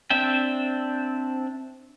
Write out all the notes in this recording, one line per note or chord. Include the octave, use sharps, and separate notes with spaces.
C4 D4 E5 G5